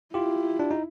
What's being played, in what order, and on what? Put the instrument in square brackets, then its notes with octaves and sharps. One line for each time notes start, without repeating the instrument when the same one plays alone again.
[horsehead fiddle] E4 [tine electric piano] F4 G4
[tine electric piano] D4
D#4